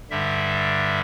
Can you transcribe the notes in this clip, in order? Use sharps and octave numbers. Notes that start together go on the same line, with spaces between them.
G2 D3 G3 E5